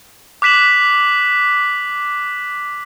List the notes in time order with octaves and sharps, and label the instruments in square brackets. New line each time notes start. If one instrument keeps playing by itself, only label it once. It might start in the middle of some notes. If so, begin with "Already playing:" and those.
[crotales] D6 F#6 B6 E7 F#7